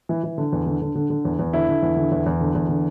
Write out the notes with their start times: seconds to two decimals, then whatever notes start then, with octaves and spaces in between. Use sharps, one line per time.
0.09 E3
0.24 E3
0.38 D3
0.52 E2
0.66 D3
0.82 D3
0.95 D3
1.10 D3
1.25 E2
1.39 E2
1.53 D3 E4
1.68 D3
1.82 E2
1.97 D3
2.11 E2
2.26 E2
2.41 D3
2.55 E2
2.69 D3